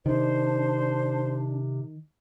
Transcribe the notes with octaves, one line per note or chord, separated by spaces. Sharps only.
C3 D#3 D4 C5